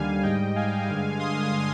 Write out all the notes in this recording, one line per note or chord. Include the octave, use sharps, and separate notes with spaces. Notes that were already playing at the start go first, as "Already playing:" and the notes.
Already playing: D#2 D3 G3 F5 G#5
G#2 G3 D#5 G5
F5 G#5
G2 D3 G#3
C6 D#6